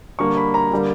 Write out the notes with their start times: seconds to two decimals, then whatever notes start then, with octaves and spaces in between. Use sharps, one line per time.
0.19 D3 G3 A#3 C#6
0.37 B5
0.54 A#5
0.71 D3 G3 A#3